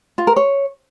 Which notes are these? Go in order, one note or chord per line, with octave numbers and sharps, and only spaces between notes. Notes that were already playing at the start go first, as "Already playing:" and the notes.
F4
A#4
C#5